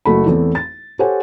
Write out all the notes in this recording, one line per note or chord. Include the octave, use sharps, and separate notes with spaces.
F#1 A3 F#4 B5
E2 A3 C4 E4
A6
G4 A4 C5 C#5 F#5 G#5